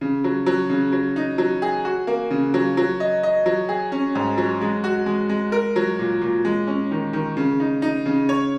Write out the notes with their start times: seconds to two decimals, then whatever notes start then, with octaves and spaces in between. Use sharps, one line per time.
0.01 C#3
0.24 F#3
0.46 F#3
0.69 C#3
0.92 F#3
1.16 D#4
1.38 F#3
1.62 G#4
1.85 F#4
2.07 A#3
2.31 C#3
2.54 F#3
2.77 F#3
3.00 D#5
3.23 D#5
3.46 F#3
3.69 G#4
3.92 C#4
4.15 G#2
4.38 F#3
4.61 G#3
4.84 F#4
5.06 G#3
5.29 G#3
5.52 A#4
5.76 F#3
5.99 A#2
6.22 A#2
6.45 G#3
6.67 C#4
6.91 D#3
7.13 D#3
7.37 C#3
7.60 D#4
7.82 D#4
8.06 C#3
8.29 C#5